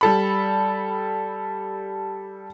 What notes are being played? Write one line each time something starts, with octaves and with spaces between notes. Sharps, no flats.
G3 A4 B5